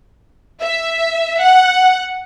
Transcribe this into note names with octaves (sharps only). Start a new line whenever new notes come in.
E5
F#5